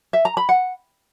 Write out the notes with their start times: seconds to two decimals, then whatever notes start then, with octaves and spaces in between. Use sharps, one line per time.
0.13 E5
0.25 A#5
0.37 B5
0.49 F#5